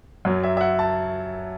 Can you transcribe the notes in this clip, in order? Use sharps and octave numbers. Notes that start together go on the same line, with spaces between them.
F#2 F#3
E5
E5
F#5
A5